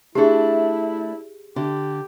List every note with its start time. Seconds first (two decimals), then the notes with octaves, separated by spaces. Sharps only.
0.15 A3 D4 E4 G4 G#4
1.56 D3 G4